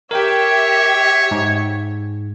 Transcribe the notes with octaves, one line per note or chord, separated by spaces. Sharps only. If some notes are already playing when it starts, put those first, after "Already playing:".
G4 A#4 C#5 E5 G5
G#2